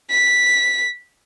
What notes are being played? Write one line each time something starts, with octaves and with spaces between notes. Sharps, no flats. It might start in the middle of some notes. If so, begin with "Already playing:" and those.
B6